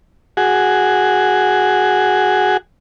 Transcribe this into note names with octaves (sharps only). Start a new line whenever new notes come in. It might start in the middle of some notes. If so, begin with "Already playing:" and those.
F#4 G#4